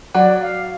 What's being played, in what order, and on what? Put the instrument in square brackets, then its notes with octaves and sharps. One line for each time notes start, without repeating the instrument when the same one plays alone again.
[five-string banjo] F#3 [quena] D5
[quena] F5